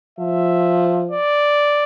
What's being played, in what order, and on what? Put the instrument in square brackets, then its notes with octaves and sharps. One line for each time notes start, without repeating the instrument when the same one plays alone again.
[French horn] F3 [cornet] E5
[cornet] D5